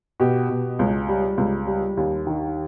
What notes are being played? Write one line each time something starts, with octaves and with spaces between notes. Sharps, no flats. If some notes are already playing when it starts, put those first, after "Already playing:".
B2 G4
B2
C#2
G3
C#2
G3
D#2
D#3